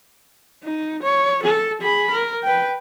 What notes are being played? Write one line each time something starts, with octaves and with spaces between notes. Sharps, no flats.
D#4
C#5
A4
G#4 B5
A#4
B4 G5